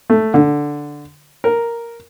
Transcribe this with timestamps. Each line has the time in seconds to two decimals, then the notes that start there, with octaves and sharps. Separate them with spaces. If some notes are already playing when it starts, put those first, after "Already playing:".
0.10 A3
0.34 D3
1.44 A#4